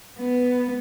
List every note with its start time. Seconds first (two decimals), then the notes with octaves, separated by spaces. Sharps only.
0.19 B3